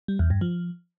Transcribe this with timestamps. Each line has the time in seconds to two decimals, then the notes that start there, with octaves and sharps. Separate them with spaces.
0.08 G3
0.19 E2
0.30 G2
0.41 F3